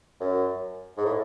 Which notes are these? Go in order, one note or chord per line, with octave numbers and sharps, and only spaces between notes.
F#2
G#2
A2